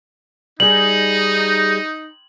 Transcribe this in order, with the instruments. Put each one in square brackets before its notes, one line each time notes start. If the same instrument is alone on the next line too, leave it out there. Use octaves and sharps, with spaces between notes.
[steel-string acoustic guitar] G3 G#4 [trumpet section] D#4 [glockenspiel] F#7